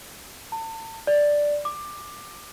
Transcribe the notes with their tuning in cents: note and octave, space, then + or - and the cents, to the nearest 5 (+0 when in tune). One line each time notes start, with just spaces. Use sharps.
A5 +35
D5 +0
D6 +15